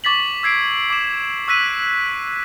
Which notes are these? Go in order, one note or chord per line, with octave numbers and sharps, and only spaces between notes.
C#6 D6 A6 B6 F#7
E6 G#6 C7 D7
D6 E7
C#6 E6 F#6 B6 D#7